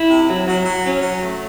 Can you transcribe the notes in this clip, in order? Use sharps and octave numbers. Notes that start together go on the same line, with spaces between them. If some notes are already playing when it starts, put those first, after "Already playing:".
Already playing: E4
C3
F#3
F#3
F#3
C#4
F#3
A3